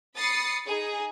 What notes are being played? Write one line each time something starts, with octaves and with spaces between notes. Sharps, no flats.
B5 D#6 A6 C7 C#7
D#4 G#4